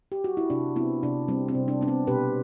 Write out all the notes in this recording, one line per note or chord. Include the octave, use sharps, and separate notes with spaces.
G4
F#4
E4
C3 D4
B3 C4 E4
C3 D4
G3 C4
C4
C3
D4
B3 D4
C4
B2 G4 B4